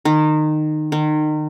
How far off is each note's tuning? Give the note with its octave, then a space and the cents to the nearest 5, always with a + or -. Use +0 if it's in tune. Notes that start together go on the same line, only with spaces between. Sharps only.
D#3 -20
D#3 -30